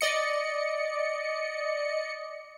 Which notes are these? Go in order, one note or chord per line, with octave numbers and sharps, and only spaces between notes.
D5 D#5 C#7